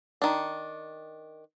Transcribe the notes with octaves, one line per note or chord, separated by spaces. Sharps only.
D#3 D4